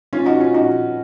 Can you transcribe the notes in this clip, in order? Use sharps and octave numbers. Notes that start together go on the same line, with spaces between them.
C#4 F4
D#4 F#4
C#4 F4
D#4 F#4